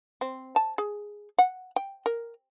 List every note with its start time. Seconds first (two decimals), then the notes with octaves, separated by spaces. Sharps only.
0.21 C4
0.56 A5
0.78 G#4
1.38 F#5
1.76 G5
2.06 A#4